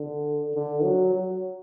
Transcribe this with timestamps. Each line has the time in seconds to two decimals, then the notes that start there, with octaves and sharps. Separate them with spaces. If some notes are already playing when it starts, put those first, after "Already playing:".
Already playing: D3
0.55 D3
0.84 F#3
1.14 F#3